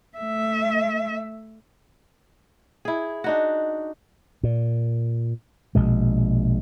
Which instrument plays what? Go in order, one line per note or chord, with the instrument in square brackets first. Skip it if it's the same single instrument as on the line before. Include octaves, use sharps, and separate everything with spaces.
[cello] A3 E5
[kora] E4 G#4
D4 D#4 F#4
[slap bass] A#2
A#1 B2 G#3